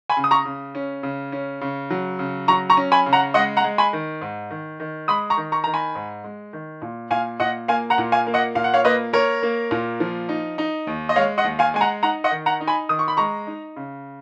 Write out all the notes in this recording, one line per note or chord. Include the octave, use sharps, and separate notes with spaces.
G#5 B5
C#3
D#6
A#5 C#6
C#3
C#4
C#3
C#4
C#3
F#3
C#3
F#3 A#5 C#6
A#5 C#6
C#4
G#5 B5
C#3
F#5 A#5
G#3 D#5 F#5
F#5 A#5
G#3
G#5 B5
D#3
G#2
D#3
D#3
G#3 B5 D#6
A#5 C#6
D#3
A#5 C#6
D#3 A#5
G#5 B5
G#2
G#3
D#3
A#2
A#2 F5 G#5
A#2 D#5 F#5
A#3 F5 G#5
F#5 A#5
A#2
F5 G#5
A#3
D#5 F#5
A#2 F5
F#5
C#5 F5
A#3 B4 D#5
A#3 A#4 C#5
A#3
A#2
F3
D#4
D#4
D#2
D#5
G#3 C#5 F5
D#5 F#5
D#2
F5 G#5
G#3 G#5
F#5 A#5
D#4 F#5 A#5
D#5 F#5
D#3
F#5 A#5
D#4
G#5 B5
D#3 D#6
C#6
B5
G#3 A#5 C#6
D#4
C#3